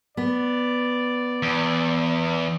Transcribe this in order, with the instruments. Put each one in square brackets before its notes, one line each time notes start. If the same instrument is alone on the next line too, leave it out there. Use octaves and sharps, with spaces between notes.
[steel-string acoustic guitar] B3 [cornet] D5
[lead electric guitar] E2